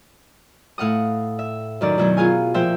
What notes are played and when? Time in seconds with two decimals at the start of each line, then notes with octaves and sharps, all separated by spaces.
0.78 A2 F5 F#5 D#6
1.39 E5
1.81 F#2 D#3 D5
1.98 B2 D#3 F#3 E4
2.17 B3 F4 G#4 F5 G#5
2.54 A#2 F3 C5 E5 G5